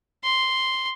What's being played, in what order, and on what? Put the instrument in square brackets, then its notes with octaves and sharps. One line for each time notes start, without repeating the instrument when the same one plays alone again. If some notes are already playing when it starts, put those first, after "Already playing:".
[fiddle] C6